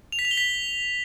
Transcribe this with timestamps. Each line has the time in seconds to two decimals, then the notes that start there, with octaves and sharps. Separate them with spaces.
0.12 F7
0.19 B6
0.25 F7
0.31 G7
0.37 B6